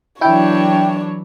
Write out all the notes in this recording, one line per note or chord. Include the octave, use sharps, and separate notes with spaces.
E3 F#3 D4 E4 C#5 G5